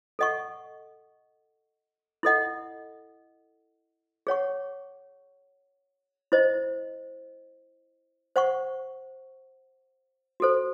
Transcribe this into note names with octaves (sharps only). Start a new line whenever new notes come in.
A4 D#5 F#5 C#6
E4 A4 D#5 F#5
G#4 C#5 F#5 C#6
E4 C5 D#5
C5 F#5 C#6
F#4 A4 C5